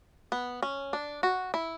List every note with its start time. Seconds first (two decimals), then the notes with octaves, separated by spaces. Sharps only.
0.32 B3
0.63 C#4
0.93 D4
1.23 F#4
1.54 E4